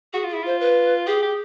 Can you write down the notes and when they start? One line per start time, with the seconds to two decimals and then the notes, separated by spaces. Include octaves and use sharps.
0.13 F#4 G#4
0.24 F4
0.29 E4 G#4
0.43 F4 C5
0.60 B4
1.07 G4 G#4
1.23 G4